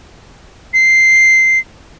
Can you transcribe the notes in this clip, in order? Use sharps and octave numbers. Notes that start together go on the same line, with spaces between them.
C7